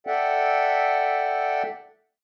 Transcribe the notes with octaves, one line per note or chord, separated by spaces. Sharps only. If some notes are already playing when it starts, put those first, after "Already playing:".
A4 D5 E5 F#5 G5